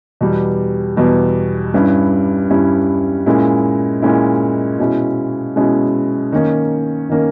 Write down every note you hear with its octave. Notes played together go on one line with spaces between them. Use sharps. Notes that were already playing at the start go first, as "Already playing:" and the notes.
E2 B2 G3
E2 B2 G3
G2 G3 C#4 E4
G2 G3 C#4 E4
A#2 G#3 C#4 E4
A#2 G#3 C#4 E4
B2 G#3 C#4 E4
B2 G#3 C#4 E4
D#3 A#3 C#4
D#3 A#3 C#4